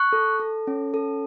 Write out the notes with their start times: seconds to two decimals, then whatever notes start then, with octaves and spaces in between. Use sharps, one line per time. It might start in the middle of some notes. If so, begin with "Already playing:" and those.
Already playing: C#6 F#6
0.13 A4
0.40 A4
0.67 C#4
0.94 A4